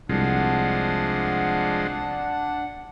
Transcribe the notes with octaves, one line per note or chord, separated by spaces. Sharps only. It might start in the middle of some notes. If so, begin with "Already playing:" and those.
C2 F3 G#3 D4 F#5